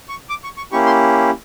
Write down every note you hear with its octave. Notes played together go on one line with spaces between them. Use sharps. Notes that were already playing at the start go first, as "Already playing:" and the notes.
C#6
D6
C#6
C#6
A#3 C#4 E4 G4 C#6
C6